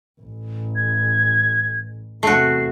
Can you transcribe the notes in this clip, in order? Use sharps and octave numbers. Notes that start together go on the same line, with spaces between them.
A1
G#6
E2 C3 A3 F#4 C7